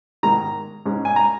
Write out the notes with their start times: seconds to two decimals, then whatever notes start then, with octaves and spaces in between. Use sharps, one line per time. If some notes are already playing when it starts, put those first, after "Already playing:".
0.23 G#2 D#3 G#3 A#5
0.86 G#2 G#3 C#4
1.05 G#5
1.16 A#5